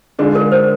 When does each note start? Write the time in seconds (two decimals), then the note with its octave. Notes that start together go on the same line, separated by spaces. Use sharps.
0.19 D3 G#3 D4 F4 G#4
0.35 A#4
0.52 C5